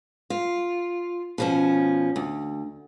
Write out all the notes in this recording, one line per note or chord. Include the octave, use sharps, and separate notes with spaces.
F4
B2 F3 C#4
D2